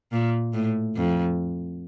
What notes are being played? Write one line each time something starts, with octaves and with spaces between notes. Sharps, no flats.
A#2
A2
F2